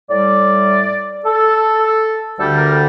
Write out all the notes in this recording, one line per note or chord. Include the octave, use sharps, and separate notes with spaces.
A2 G3 D5
A4
D2 D3 G3 A4
A#4